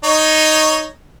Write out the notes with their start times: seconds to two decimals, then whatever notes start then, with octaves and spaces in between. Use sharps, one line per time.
0.04 D#4 C#5